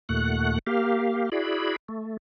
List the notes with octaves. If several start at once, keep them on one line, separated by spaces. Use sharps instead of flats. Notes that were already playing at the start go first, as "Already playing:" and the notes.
D#2 A#2 A3 F#5 F#6
A#3 G4 F5
E4 F#4 G#4 D5 B5
A3